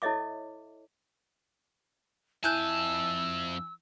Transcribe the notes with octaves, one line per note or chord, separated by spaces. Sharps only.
E4 A4 C#5 D#5 E5 D6
F2 E4 G#5 A5 E6 F#6 G6